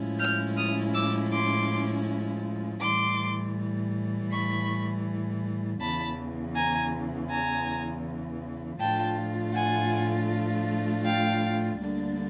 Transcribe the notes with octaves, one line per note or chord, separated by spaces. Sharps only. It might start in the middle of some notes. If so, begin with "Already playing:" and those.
Already playing: A2 F3 G#3 C#4 E4
F6 G6
D#6 F6
D6 E6
C6 D6
A2 E3 G3 C6 D6
B5 C#6
E2 C#3 E3 A5 B5
G#5 A#5
G#5 A#5
A2 F3 A3 D4 F4 G5 A5
F#5 G#5
F5 G5
D2 D3 G3 A#3 D4